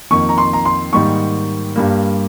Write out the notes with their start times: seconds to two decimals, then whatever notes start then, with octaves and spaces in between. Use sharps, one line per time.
0.10 F2 D#3 A#3 C#6
0.29 A#5
0.38 C6
0.53 A#5
0.65 C6
0.92 G#2 D#3 G3 A#3 C#6
1.76 G2 G3 A#3